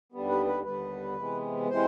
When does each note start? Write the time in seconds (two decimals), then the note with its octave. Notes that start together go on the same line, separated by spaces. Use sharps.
0.12 D#2 D3 G3 B3
0.29 B4
0.47 B4
0.64 D#2 D3 G3 B3 B4
1.16 C3 E3 G#3 B3
1.69 C3 E3 G#3 C5